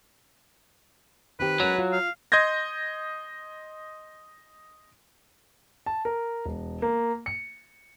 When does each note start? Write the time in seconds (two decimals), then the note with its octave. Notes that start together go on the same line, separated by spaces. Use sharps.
1.40 D#3 C4 G4 B4
1.60 F#3 G#3 C#4 A#4
1.79 F4
1.92 F5
2.32 D#5 C6 G6 G#6 A#6
5.86 A5
6.05 A#4
6.46 E1
6.82 A#3
7.26 C#7